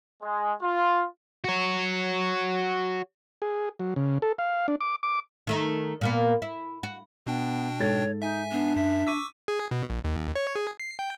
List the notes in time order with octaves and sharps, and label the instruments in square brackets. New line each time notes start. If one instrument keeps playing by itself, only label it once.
[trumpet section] G#3
F4
[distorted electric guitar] F#4 C#5
[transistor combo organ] G#4
F#3
C#3
A4
F5
D4
D6
D6
[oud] D#3 A3 D#4
A#2 A#3 B3
E4
F#4
[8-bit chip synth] B2 D4 G5 [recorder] B3
[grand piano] G#2 A4 A6 [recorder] C#5
[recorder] D#4 [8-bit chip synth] E5 G#5
[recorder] B3 [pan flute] D4
[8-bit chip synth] F#2 B6 [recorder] E5
[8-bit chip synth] C#6 D6 E6 [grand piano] B6 D#7
[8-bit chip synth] G#4
B2
A#1
D#2
C#5
G#4
C7
G5